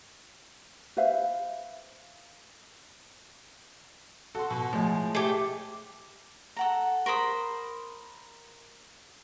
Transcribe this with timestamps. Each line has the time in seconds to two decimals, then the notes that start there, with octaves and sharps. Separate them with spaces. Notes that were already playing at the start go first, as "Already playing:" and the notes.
0.97 B4 C5 E5 F5
4.35 F#4 A4 C6
4.51 B2
4.73 A2 F3 G#3 G#5
5.15 A3 G4 G#4
6.57 A4 F#5 A#5
7.06 A#4 C5 B5 D#6